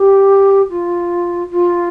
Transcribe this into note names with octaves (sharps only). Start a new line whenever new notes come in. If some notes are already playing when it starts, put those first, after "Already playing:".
Already playing: G4
F4
F4